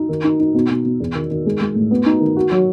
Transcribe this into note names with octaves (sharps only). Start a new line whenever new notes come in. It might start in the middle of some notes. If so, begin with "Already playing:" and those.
Already playing: D#4
D#3
D#4
D#4
B2
B2
B2
E2
D#3
D#3
G#3
G#3
A2
B3
D#4
D#3
F#4
F#3